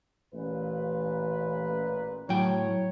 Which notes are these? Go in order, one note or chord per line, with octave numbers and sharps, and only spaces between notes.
A1 A#2 B4
A2 F#3 E4 A#4 C#5 G5